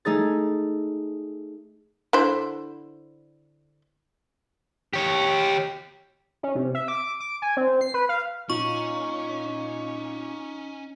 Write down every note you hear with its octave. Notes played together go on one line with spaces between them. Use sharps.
A3 D#4 G#4 A6
D3 E4 C5
G4 C#5
C#4
C3
E5
D6
D6
G#5
C4
C7
B4
F5
A#2 C#4 D#4 C#6